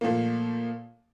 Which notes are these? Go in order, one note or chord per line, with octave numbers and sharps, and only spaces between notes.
A#2 F3 A3 A#3